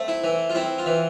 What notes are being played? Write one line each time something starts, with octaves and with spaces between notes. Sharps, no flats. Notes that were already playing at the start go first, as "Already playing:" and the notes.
Already playing: A3 C4
E4
E3
F4
C4 E4
F4
E3